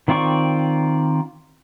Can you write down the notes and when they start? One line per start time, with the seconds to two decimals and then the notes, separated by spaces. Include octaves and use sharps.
0.08 D#3 C4 F4 D5 C#6